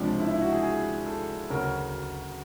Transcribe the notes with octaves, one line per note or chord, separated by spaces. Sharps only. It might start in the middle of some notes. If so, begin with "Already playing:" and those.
Already playing: C#2 C3 F3 D4
E4
E4
F#4
G#4
G#4
A4
D2 C#3 F#3 A#4